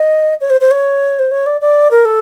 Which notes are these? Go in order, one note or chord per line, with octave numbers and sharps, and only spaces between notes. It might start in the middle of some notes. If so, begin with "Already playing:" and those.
Already playing: D#5
C#5
C5
C5
C#5
C5
C#5
D5
D5
A#4
A4